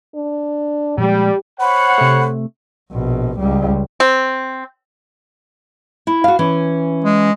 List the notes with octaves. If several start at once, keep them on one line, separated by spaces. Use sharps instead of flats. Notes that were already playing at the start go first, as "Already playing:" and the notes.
D4
A#2 F3 G3 G#3 G4
C5 C#5 F#5 B5
C3 A3
A#1 B2
C#2 G3
C4
E4
F#4 F5
E3 C#4
G#3